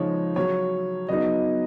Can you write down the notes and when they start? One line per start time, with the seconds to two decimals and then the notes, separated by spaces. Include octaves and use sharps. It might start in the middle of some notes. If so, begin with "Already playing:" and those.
Already playing: C#3 F3 G#3 D#4 C#5
0.36 C#3 F#3 C#4 C#5
1.09 C#3 F#3 B3 D#4 D#5